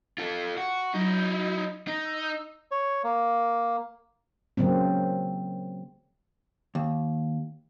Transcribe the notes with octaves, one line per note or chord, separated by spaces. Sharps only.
F4 A4
F#4
F#3 D#4 E4
D#4
E6
C#5
A#3
C#3 F#3 A#3 C4
D#2